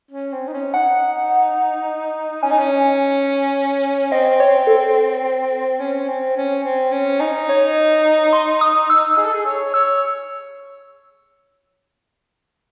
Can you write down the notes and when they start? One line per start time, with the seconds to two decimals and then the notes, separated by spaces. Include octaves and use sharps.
0.11 C#4
0.32 C4
0.48 D#4
0.53 C#4
0.74 D#4 F#5
2.43 C#4 G#5
2.51 D#4
2.59 C#4
4.11 C4 D#5
4.40 C#5
4.67 A4
5.80 C#4
6.08 C4
6.37 C#4
6.64 C4
6.92 C#4
7.20 D#4
7.49 C#5
8.33 C6
8.61 D#6
8.90 E6
9.17 G#4 E6
9.25 A4
9.33 G#4
9.45 C#5
9.74 C#5 E6